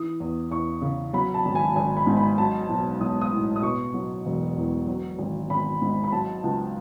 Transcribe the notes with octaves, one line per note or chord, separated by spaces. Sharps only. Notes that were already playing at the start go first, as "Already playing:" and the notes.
Already playing: E3 D#6
E2
E2 C#6
C#3
F#3 B5
A5
G#1
G#5
G#1 G#5
B5
G#2
B5
F#3 A5
B1
B1 D#6
D#6
A2
D#6
B2 C#6
F#3
E1
E2
F#3
G#1
G#1 B5
G#2
B5
F#3 A5
C#2